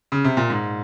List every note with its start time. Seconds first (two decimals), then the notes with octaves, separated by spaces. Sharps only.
0.12 C#3
0.24 C3
0.37 A#2
0.50 G#2